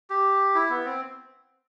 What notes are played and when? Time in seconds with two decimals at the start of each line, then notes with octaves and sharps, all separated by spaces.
0.10 G4
0.55 E4
0.70 B3
0.85 C4